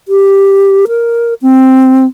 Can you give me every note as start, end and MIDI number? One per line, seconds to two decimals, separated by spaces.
0.08 0.86 67
0.88 1.34 70
1.42 2.05 60